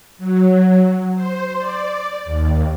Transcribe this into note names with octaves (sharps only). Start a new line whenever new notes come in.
F#3
C5
D5
D#2